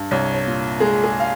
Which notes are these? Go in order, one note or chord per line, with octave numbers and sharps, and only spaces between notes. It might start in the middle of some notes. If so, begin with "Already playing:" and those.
Already playing: G2
C2 C#5
C#5
A#2
G#3 G#4
G#4
F5